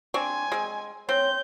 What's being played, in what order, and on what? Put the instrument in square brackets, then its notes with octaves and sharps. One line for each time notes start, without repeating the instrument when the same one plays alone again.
[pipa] C4 D4 C#6 [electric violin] G#5
[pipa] G#3 C4
[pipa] C4 [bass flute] C#5 [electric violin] G6